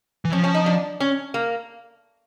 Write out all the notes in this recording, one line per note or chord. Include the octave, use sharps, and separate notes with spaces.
E3
F3 C#4
C#4
D#4
D4
C#4
A#3